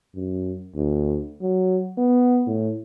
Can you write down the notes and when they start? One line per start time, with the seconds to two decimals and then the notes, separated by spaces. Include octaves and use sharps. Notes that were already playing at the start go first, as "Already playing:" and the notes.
0.15 F#2
0.76 D2
1.42 F#3
1.98 B3
2.47 A2